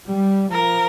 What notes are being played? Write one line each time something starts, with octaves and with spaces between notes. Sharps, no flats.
G3
F3 A#4